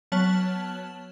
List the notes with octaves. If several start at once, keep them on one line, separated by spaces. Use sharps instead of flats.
F#3 B3 C#5 A5 F6 F#7